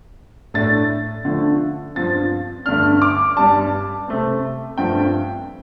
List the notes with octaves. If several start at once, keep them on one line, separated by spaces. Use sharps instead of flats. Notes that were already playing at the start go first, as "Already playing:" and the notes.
A2 A3 D4 A6
D3 F3 A3
G2 F3 C4 A6
G2 D3 A3 D4 F6
D6
G2 G3 D4 A5
C3 A3 C4
G2 F3 A3 C4 G5